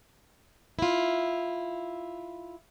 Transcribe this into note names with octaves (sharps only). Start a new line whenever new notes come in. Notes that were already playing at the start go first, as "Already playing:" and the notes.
E4 F4